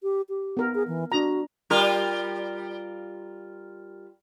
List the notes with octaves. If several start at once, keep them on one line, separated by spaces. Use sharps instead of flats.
G4
G4
B3 A#4
G#4
E3
D4 F#4 A#5
G3 F4 A#4